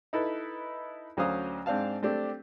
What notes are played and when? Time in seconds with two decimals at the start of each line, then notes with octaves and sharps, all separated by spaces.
0.13 D#4 E4 A4 B4
1.17 D2 F#3 C#4 C5 F5 D#6
1.66 G#2 C4 D4 C5 F5 A5
2.03 A3 C4 D4 G4